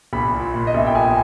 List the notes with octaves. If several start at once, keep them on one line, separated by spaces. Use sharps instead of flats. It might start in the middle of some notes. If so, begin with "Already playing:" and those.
A#1 B5
A#2
A#2
D#5
A#1 E5
G5
A#1 G#5